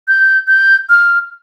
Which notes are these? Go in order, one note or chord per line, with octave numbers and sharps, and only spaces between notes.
G6
G6
F6